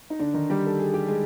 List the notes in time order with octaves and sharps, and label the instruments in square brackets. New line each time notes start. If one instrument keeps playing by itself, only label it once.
[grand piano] D#4
D3 D4
D#3 D#4
G3 G4
A4
G#4
G4
G#3 G#4